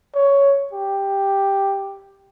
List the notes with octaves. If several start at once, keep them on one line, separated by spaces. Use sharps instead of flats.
C#5
G4